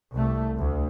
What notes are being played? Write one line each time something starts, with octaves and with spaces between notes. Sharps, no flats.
C2 A3
D2